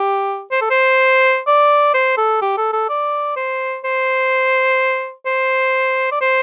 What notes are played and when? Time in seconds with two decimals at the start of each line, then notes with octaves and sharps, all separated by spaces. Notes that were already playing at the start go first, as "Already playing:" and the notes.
Already playing: G4
0.52 C5
0.61 A4
0.70 C5
1.47 D5
1.94 C5
2.17 A4
2.41 G4
2.57 A4
2.73 A4
2.89 D5
3.36 C5
3.84 C5
5.26 C5
6.12 D5
6.21 C5